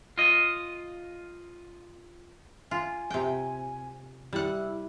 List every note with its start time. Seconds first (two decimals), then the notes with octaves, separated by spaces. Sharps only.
0.18 F4 D#5
2.71 F4 G#5
3.10 C3 G5
4.33 G3 E4 F#5